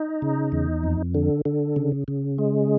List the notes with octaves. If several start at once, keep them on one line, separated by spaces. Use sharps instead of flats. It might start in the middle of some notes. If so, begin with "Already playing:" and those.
Already playing: D#4
C#3
E2
F2
D3
D3
C#3
C#3
G#3